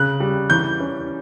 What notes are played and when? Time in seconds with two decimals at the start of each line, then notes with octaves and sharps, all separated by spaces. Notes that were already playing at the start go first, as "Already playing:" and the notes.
Already playing: C#3 F#6
0.20 G3
0.50 E3 G6
0.80 C#4